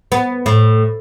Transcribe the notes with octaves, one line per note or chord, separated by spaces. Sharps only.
B3
A2